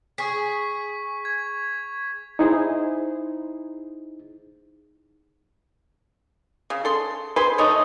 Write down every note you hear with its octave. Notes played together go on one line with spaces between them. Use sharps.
G#4 C#6 B6
G#6
D#4 E4 G#4 C5
C#3
A4 C6
G#4 B4 C5 C6
A3 D#4 C#5 D#5